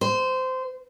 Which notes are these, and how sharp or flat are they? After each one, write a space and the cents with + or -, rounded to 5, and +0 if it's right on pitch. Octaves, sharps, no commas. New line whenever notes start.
C5 -20